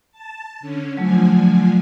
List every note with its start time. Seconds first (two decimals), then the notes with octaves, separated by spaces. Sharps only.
0.11 A5
0.60 D3 C#4
0.97 D3 F3 F#3 A3 G#5